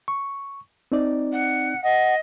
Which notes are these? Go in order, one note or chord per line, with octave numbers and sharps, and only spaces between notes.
C#6
C4 D#4 D5
F#5
D#5 F#5